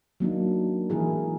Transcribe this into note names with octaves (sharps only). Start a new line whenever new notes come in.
F#3 A#3 D4 D#4
E3 E4 G#4 A#4